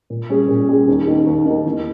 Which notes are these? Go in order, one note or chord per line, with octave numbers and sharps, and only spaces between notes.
A#2
G3 C#4 G#4
A#2
G3 C#4 G#4
D#2
D#3 A#3
D#2
D#3 A#3
E2